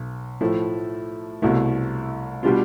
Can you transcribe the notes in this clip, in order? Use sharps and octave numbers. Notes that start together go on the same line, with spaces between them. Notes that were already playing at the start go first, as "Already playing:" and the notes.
Already playing: B1
A2 F3 A3 E4
C2 B2 A3 E4
B2 G3 D4 F4